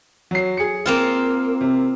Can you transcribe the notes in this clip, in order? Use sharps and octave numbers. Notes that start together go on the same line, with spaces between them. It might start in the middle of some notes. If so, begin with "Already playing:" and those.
F#3 C7
G#4 C#7
A#3 C4 F4
C3